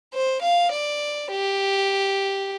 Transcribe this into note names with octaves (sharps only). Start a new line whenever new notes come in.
C5
F5
D5
G4